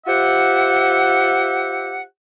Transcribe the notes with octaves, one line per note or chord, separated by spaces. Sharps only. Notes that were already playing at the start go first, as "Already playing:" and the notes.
F4 G4 C5 E5 F#5